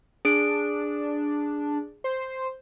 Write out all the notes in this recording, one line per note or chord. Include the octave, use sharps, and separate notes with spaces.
D4 G#4 D7
C5